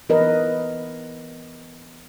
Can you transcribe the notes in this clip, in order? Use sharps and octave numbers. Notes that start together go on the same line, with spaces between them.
E3 B3 A#4 B4 D#5